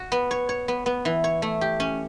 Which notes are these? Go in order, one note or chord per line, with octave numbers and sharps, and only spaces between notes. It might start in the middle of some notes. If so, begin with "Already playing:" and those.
Already playing: F#4
B3
C#5
C#5
B3
B3
E3
C#5
A3
G4
C#4